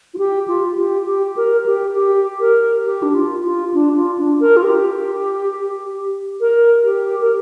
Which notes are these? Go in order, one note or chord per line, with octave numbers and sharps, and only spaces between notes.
F4
G4
F4
G4
G4
A#4
G4
G4
A#4
G4
D4
F4
F4
D4
F4
D4
A#4
F4
G4
A#4
G4
A#4